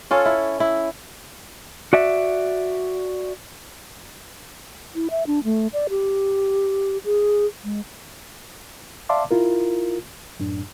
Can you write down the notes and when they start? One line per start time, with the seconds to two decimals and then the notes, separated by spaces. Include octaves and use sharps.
0.11 C#4 F4 A4 C#5
0.25 E4
0.60 E4
1.93 F#4 D5 E5
4.95 E4
5.11 E5
5.27 D4
5.44 A3
5.73 D5
5.90 G4
7.05 G#4
7.64 G#3
9.09 D5 E5 F5 A5 C6 D6
9.31 E4 F4 A#4
10.40 F#2 A2 D4